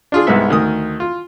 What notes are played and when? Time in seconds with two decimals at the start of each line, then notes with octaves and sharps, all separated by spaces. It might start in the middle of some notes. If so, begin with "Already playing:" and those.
0.12 D4 F4 G#4
0.27 C2 G#2 G#3 B3 E5
0.50 D2 D#3 A#4 D#6
1.00 F4